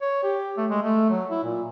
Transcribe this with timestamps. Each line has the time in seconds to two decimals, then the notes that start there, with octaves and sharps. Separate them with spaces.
0.02 C#5
0.23 G4
0.57 A3
0.70 G#3
0.83 A3
1.10 F#3
1.31 E4
1.44 A#2